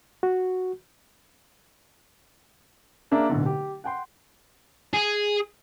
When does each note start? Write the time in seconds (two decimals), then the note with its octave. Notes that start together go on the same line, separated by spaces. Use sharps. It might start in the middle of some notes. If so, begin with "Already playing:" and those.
0.23 F#4
3.11 A#3 D4 G#4 A#4 E5
3.29 D1 B1 D3
3.46 G4
3.84 F#5 G5 C6
4.94 G#4